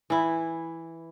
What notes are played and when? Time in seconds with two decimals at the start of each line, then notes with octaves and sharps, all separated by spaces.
0.10 E3 E4